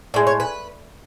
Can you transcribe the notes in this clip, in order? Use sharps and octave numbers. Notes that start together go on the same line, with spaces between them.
A2 G#3 D5
C#5
B4